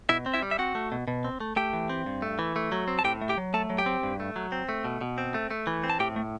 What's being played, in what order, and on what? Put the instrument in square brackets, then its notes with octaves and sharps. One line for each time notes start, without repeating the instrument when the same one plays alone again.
[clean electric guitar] B2 E4 E5
C4
E4 E5
G3
E5
C4 F#4 F#5
A3
B2
B2
C4
A3
A3 G4 G5
E3
C4
G2
A3
E3
A3
F#3
C4
A5
A2 G4 G5
A3
G4 G5
F#3
A3 A4 A5
F#3
G4 G5
C4
G2
A3
F#3
C4
A3
B2
B2
C4
A3
A3
E3
C4
A5
A2 G4 G5
A3